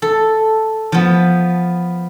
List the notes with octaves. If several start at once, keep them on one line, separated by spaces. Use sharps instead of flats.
A4
F3 B3